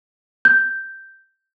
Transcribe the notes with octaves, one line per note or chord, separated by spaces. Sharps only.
G6